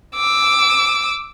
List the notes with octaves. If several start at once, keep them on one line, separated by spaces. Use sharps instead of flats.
D6 E6